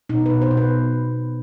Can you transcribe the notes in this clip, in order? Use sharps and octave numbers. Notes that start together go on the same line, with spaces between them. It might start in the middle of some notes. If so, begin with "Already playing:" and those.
B2 D#4
B2 B4
C5
B2
B4